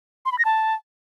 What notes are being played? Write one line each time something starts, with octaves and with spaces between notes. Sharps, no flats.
C6
B5
A#6
A5